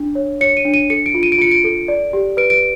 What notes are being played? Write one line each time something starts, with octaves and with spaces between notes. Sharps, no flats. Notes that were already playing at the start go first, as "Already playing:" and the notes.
Already playing: D4
C#5
C#5 C#7
D#7
D4
D#7
A4 C#7
D7
F4
D#7
D7
F4 C#7
D7
A4
D5
G4
B4 D7
D7